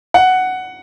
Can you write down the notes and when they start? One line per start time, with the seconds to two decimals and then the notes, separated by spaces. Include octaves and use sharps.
0.14 F#5